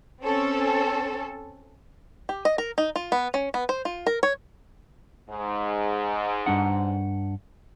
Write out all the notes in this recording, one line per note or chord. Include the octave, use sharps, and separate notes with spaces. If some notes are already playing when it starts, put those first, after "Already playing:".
C4 C#4 A4
G4
D#5
A#4
D#4
F4
B3
C#4
B3
C5
F4
A#4
C#5
G#2
G2 D4 F#5